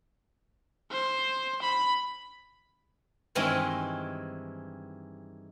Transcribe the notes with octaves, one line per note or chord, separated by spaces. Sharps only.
C5
B5
G2 D#3 E3 G#3 C4 C#5